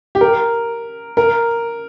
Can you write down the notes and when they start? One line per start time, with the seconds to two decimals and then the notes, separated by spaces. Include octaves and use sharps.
0.15 G4
0.21 A#4
1.17 A#4